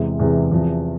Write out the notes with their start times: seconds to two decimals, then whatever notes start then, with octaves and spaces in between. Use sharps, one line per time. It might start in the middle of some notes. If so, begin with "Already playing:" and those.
Already playing: E2 C3 E3 G#3
0.19 E2 C3 E3 G#3
0.52 E2 C3 F3